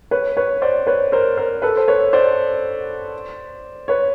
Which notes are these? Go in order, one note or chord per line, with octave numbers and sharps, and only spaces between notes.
B4 C#5
B4 C#5
C5 D5
B4 C#5
A#4 C5
A#4 C5
A4 B4
C5
B4 C#5
C5 D5
B4 C#5